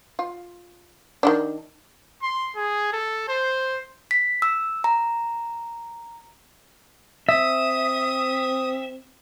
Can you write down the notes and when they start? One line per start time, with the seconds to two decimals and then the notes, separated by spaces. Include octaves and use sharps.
0.19 F4
1.23 D#3 E3 D4
2.23 C6
2.56 G#4
2.93 A4
3.28 C5
4.11 B6
4.42 E6
4.84 A#5
7.29 C4 E5 D#6